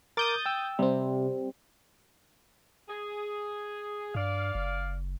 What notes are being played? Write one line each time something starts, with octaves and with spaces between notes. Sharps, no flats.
A#4 D6 D#6 G6 A6
G5 E6
C3 G3 C4
G#4
G2 D5 F5
F#1